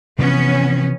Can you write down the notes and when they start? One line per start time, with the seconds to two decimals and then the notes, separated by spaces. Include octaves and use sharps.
0.19 C3 E3 F3 B3 C#4